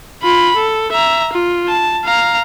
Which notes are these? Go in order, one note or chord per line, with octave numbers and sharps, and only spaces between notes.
F4 B5
A4
E5 A#5
F4
A5
F5 A#5